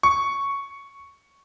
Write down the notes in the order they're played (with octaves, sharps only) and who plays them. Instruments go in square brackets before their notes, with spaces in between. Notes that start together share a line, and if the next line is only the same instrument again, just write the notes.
[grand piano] C#6